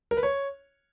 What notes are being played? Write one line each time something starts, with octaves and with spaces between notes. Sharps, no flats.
A#4
B4
C#5